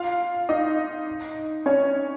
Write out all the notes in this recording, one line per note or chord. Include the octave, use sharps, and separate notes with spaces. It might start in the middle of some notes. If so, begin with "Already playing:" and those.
Already playing: F4 F5
D#4 D#5
C#4 C#5